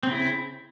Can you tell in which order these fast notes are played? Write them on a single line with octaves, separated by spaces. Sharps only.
C4 C#3 E4